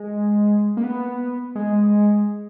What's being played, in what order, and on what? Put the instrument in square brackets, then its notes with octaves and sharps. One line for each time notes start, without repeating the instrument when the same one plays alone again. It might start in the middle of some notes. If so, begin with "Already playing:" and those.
Already playing: [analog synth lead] G#3
A#3
B3
G#3